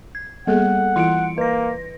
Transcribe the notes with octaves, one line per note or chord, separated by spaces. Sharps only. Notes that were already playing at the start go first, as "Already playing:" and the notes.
G#6
G3 A#3 B3 G#4 A4 F#5
E3 E4 F4 C6 C#7 D7
A#3 B4 A#6